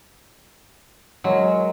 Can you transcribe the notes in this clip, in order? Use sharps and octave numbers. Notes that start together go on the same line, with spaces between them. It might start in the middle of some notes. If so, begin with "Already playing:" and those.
F#3 G#3 A#4